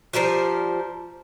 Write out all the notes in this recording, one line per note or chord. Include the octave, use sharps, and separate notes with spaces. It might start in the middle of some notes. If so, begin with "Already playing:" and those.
F3 G3 A#4 C5